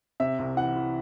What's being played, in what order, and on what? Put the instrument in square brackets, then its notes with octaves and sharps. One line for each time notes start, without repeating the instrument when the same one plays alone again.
[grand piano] C3 E5
C2
E3 F#5
E3